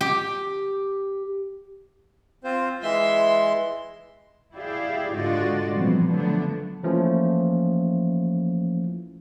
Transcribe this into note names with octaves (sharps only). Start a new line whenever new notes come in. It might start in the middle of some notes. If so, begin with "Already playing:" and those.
G4
C4 F4 C5
E3 G#3 E5 C6
E4 G4 G#4 D5 E5 F5
G#2 D3 F4 F#4 D5 D#5
A#2 E3 F3 G3 B3 C4
D3 F3 F#3 A3 B3 D4
E3 F3 A3 A#3 C#4 E4